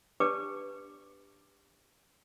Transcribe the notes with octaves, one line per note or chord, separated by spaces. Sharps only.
D4 G4 B4 D5 A5 D6